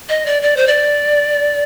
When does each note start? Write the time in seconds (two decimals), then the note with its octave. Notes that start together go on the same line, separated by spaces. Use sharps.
0.09 D#5
0.26 D5
0.42 D5
0.57 C5
0.67 D5